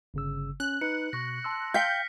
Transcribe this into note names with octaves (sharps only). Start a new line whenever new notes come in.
G1 C#3 E6
C#4 F#6
D#4 B4 C#7
B2 C#6 A#6
A5 C6 E6
F5 G5 F6 G6 B6 C#7